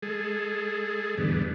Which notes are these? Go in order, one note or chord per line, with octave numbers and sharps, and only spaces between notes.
G#3 G#4 A4
E2 G#2 D3 G3 B3